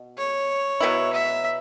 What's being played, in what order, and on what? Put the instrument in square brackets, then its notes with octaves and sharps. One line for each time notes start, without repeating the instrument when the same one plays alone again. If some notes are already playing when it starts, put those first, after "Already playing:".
Already playing: [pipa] B2
[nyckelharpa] C#5
[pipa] B2 F#3 B3 E4
[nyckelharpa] E5